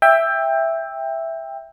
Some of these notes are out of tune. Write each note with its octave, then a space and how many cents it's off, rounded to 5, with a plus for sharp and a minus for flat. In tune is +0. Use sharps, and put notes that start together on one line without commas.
E5 +0 G5 +20